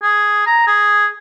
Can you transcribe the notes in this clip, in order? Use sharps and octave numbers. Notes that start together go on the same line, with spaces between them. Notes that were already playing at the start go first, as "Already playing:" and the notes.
G#4
A#5
G#4